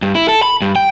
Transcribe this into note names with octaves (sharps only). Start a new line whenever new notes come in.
G2
E4
A4
B5
G2
G5